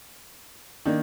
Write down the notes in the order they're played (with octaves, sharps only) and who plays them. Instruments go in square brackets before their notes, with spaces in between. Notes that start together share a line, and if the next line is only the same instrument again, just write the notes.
[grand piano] D#3 [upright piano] A#3 D4